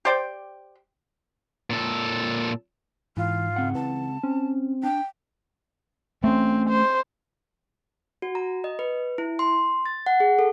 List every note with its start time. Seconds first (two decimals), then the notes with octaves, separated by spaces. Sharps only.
0.05 G4 C5 D5 G5
1.70 A#2 A4
3.17 G#2 E3 F4
3.56 C#2 C4 F#5
3.75 E3 A5
4.23 C4 C#4
4.83 D4 G5
6.24 A3 C4 C#4
6.69 C5
8.22 F#4
8.35 A#5
8.64 D#5
8.79 B4
9.18 E4
9.39 C6
9.86 A6
10.06 F#5
10.20 G#4
10.39 A4